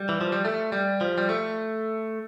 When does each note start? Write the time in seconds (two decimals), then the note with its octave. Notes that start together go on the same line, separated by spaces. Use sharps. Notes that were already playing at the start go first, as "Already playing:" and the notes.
Already playing: G3
0.09 E3
0.21 F3
0.32 G3
0.45 A3
0.72 G3
1.01 F3
1.18 G3
1.29 A3